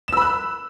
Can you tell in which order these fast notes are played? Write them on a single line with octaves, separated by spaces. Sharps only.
E7 E6 B5 F#6